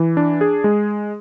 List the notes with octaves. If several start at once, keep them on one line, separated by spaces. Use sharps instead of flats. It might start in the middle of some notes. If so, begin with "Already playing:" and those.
Already playing: E3
D4
G#4
G#3